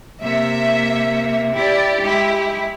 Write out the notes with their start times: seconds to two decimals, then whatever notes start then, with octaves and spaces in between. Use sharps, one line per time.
0.22 C3 A#3 E5
1.55 E4 G4 D5
2.02 G#3 E4